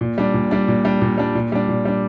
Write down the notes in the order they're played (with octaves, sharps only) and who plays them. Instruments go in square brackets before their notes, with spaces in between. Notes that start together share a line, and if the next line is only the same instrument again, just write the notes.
[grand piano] A#2
G3 D4
A#2
G3 D4
A#2
G3 D4
A#2
G3 D4
A#2
G3 D4
A#2
G3 D4